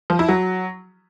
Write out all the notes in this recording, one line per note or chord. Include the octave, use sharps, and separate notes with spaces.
F3
E4
F#3